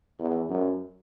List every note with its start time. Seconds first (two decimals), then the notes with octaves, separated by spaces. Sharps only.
0.19 E2
0.49 F#2